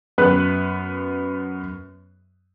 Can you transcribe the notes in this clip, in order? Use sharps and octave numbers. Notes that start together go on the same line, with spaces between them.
F#2 B3 B4 F#6